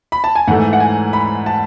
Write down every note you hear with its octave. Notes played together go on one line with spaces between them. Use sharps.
B5
A5
G#5
G#2 E3 A3 F#5
F#5
G#5
B5
A5